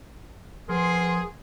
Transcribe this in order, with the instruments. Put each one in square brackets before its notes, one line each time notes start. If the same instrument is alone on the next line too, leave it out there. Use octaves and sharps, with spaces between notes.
[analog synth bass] F3 [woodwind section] B3 A#4 C6 [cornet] G#4